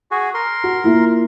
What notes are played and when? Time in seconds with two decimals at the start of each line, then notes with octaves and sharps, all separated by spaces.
0.11 F#4 G#4
0.34 A#4 C6
0.64 F#4
0.84 A#3 E4 F4